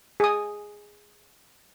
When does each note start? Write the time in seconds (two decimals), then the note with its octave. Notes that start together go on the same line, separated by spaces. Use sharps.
0.20 G#4 D#6